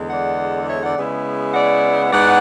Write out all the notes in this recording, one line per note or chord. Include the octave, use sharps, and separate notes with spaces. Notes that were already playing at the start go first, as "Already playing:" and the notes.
Already playing: E2 D3 G#3
D5 F#5
C#5 E5
D5 F#5
C#3 G#3 B3 E4
D5 F#5
G#2 G#3 B3 E4 D5 F#5